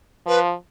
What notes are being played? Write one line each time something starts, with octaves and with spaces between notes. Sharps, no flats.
F3 B4